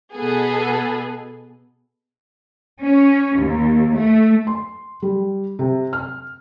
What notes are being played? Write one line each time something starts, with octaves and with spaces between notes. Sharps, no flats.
B2 B3 G#4 A4
C#4
D#2
A3
C6
G3
C3
F6